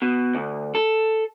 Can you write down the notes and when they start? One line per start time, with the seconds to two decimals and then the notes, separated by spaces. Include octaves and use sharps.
0.02 B2
0.35 D2
0.75 A4